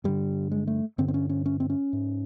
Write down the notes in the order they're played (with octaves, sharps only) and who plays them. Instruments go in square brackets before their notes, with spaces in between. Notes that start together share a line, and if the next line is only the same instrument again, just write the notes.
[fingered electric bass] G2 D3 G3
G#3
A3
G2 D3 C4
C4
C#4
C#4
C#4
C4
C#4
G#2